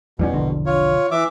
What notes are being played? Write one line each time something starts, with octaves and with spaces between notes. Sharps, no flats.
E2 B2 G3 C#4
E1 A#1 D3
F4 C#5
E3 E5 D6